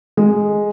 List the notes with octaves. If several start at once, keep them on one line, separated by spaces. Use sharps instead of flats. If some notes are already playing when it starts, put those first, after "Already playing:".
G#3